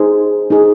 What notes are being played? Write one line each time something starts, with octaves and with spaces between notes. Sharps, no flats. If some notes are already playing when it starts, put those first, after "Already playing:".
Already playing: D#4 G#4 C5
D#4 G#4 C5